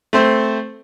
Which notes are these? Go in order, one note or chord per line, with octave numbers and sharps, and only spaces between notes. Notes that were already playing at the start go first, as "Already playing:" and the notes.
A3 C4 C5